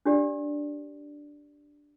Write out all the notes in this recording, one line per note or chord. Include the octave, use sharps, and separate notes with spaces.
D4 G4 D5